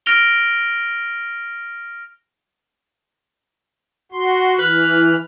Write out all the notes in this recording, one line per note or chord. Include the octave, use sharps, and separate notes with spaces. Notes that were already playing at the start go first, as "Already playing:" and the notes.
F6 A#6 D7 F7 G7
F#4 C6
E3 B4 F6